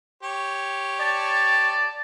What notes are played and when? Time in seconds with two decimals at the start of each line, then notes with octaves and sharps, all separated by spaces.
0.23 G4 C#5
1.00 D5 A5